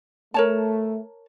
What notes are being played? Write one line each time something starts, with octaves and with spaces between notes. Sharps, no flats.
A3 A#4 C#5 A5